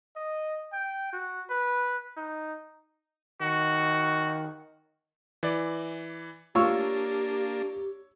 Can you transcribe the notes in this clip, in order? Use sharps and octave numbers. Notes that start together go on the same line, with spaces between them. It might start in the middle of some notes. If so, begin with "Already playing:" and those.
D#5
G5
F#4
B4
D#4
D#3 F#4
E3 D5
A#3 D4 F4 G4 C#5 C#6 E6